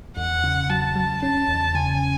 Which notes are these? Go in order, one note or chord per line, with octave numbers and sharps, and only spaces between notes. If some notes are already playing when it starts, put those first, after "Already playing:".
E2 F#5
C#3
F#3 A5
F#3
C#4 A5
E2
C#3 G#5